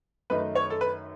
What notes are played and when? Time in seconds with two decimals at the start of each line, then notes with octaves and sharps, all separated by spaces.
0.30 F#2 D#3 A3 D#4 B4
0.55 C#5
0.70 A4
0.81 B4